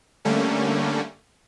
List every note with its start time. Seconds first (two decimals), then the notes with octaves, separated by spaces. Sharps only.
0.25 D3 G3 A3 A#3 C#4